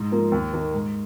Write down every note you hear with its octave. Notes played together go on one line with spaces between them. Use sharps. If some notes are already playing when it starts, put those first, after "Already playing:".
Already playing: G#2
F3 A#3
D#2
D#3 A#3
G#2